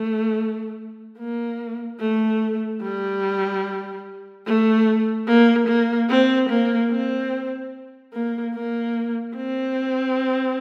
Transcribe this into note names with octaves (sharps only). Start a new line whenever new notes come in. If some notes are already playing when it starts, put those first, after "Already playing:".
Already playing: A3
A#3
A3
G3
A3
A#3
A#3
C4
A#3
C4
A#3
A#3
C4